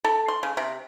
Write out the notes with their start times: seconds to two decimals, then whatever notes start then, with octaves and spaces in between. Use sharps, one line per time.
0.04 A4
0.28 C6
0.43 C#3
0.57 C3